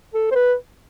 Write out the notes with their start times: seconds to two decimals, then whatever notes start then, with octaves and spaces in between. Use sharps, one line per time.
0.14 A4
0.31 C5
0.35 B4